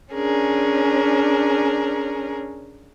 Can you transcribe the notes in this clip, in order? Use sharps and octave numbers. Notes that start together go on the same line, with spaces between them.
C#4 D4 G#4 A#4